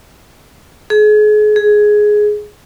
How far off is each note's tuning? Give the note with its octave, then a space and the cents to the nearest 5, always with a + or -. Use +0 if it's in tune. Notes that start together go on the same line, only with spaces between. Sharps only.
G#4 +35
G#4 +10